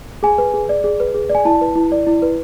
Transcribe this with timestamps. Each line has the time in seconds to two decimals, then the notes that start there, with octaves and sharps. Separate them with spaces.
0.23 G#4 G#5
0.38 B4
0.54 G#4
0.69 D5
0.84 G#4
1.00 B4
1.14 G#4
1.30 D5
1.35 G#5
1.45 E4 A5
1.61 B4
1.75 E4
1.92 D5
2.07 E4
2.22 B4